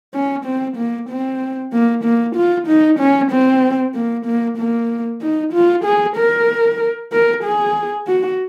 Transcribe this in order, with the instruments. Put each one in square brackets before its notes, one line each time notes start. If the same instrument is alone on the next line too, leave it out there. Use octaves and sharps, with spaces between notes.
[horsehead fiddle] C#4
C4
A#3
C4
A#3
A#3
F4
D#4
C#4
C4
A#3
A#3
A#3
D#4
F4
G#4
A#4
A#4
G#4
F#4